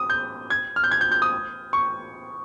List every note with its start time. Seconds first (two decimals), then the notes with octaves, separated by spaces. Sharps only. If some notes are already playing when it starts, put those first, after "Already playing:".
Already playing: D#6
0.10 G6
0.50 G#6
0.76 F6
0.84 G6
0.91 G#6
1.01 G6
1.11 G6
1.22 D#6
1.73 C#6